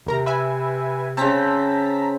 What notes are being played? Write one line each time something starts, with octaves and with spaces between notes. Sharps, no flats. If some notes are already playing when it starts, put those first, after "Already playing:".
D#2 C3 A#4 A#5
B4 E5 G#5
C#3 C4 A5 A#5 B6